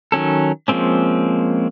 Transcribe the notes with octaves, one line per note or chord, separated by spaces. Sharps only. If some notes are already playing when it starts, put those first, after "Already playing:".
D#3 F#3 C#4 A4
F3 G#3 A#3 C4 C#4